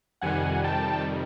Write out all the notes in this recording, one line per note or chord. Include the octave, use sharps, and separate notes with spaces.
F2 C3 D#3 G3 F#5 G#5
G5 A5